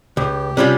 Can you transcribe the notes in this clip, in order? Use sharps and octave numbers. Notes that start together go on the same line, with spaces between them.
C#2 G4
C3 G3 C#4 F4